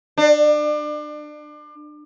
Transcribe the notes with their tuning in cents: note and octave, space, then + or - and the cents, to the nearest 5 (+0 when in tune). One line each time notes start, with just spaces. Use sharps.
D4 +30